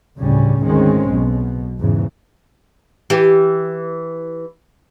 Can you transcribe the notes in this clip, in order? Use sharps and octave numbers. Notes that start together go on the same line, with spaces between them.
G1 D2 A2 C#3 G3 C#4
G#1 D2 D#3 G#3 C4 C#4
B1 B2
E2 G#2 C#3 E3
E3 G4